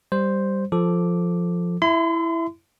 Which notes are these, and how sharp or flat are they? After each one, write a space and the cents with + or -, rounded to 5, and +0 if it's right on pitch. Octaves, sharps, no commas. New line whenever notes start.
G3 +0 C5 +0
F3 +0 A4 +0 D6 +0
E4 +5 E5 +0 C6 -40